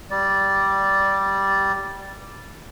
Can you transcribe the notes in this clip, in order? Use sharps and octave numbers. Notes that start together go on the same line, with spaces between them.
G3 D5